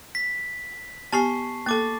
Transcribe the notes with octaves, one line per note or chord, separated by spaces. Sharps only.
B6
B3 G4 G#5 A5 C#6 C7
A#3 A4 A5 D6 A6